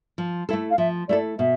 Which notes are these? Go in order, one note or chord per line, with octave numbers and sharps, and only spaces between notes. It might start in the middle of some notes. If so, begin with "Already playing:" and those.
F3
A3 E4 A4
F5
F3 E5
A3 E4 A4 D5
B2 E5